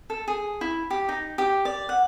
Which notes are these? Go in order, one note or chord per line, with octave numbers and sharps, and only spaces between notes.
A4
G#4
E4
G4
D#4
G4
D5
F#5